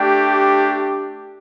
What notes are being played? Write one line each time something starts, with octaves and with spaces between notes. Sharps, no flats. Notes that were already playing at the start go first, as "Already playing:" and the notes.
Already playing: A3 D4 G4